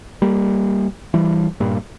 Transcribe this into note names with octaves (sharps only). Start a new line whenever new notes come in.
G3 A#3
E3 G3
G2 A#2